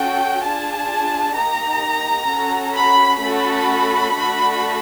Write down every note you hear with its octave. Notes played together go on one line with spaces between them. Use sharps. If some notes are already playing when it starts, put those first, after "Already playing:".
Already playing: C#4 F#4 A4 G5
D4 F4 G#4 A5
A#3 D#4 G4 A#5
C#4 F#4 A4
B5
A3 C#4 F#4 A4 B5
A3 D4 F#4 A4